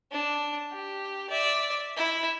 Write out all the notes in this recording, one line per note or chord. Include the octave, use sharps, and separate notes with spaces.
D4
G4
D5 E5
E4 E5